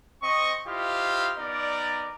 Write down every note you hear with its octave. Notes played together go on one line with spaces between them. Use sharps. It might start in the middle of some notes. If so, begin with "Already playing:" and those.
C4 D#5 C#6
E4 F4 G4 C5 D#5 F5
B3 D#4 A#4 D5